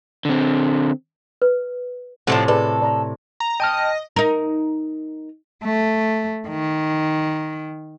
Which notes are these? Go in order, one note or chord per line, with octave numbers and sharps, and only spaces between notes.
D3 C4
B4
A2 C3 F3 D4 A4 F#5
G#4 A4 B4 D5
D5 A#5
A#5
D#5 G5 A5 F6
D#4 A#4
A3
D#3